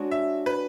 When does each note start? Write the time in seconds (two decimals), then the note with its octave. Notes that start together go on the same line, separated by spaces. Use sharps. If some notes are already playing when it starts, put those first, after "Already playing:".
Already playing: G#3 D4 F#4 C#5
0.11 E5
0.46 B4